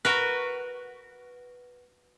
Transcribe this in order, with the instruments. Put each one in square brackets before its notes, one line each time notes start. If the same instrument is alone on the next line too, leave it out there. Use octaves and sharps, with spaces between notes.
[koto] F#4 A#4 B4